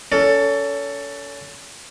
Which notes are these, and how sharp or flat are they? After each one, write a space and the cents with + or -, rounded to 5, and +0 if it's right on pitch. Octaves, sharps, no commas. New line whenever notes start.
C#4 +35 A4 +15